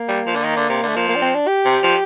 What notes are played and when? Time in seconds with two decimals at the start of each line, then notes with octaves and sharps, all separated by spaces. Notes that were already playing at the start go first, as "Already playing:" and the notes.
Already playing: A#3
0.09 G3
0.26 F3
0.36 D3
0.44 D#3
0.56 D3
0.69 C3
0.83 D3
0.88 A3
0.95 F3 A#3
1.09 A#3
1.16 D4
1.22 C4
1.35 D4
1.48 G4
1.65 C3
1.83 F3